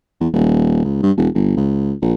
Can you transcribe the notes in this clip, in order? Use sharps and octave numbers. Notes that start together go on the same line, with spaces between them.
E2
D#1
C#2
G2
E1
G1
C#2
A#1